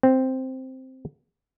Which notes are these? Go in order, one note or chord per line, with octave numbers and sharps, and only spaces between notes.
C4